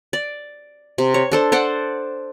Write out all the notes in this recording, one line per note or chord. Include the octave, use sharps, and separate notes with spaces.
D5
C3
C#5
D4 A4 C5
C5 D5 F#5